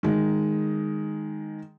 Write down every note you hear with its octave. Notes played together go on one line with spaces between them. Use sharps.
D#3 G#3